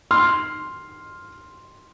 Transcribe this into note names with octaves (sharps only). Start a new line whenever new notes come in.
C6 F6